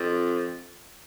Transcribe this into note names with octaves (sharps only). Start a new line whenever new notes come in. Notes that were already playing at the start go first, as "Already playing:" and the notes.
Already playing: F2